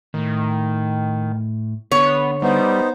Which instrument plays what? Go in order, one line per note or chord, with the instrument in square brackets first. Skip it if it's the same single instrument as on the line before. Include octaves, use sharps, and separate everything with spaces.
[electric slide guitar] A2 [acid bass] D#3
[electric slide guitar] D3 [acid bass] B3 [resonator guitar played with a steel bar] C#5
[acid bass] G3 [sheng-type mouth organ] B3 D#4 C5